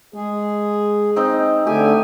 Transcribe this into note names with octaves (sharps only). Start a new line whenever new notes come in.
G#3 G#4
C4 D#4
D3 A3 G4 G#5